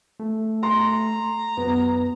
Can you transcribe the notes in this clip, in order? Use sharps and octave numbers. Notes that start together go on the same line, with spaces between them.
A3
A#5 C6
F#2 B3